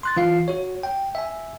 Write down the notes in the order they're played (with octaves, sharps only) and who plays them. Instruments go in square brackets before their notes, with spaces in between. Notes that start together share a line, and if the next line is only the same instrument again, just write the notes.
[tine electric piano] C6 F#6 A6
E3 F4 F5 C7
F#4 C#5
G5
E5 G#5